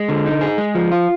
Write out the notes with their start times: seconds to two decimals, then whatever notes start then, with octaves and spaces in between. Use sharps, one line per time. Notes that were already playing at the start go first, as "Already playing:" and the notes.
Already playing: G#3
0.09 D3
0.26 D#4
0.41 G#4
0.58 G#3
0.75 F3
0.92 F4